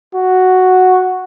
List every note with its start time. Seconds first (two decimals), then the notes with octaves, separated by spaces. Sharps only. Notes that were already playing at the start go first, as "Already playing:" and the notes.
0.15 F#4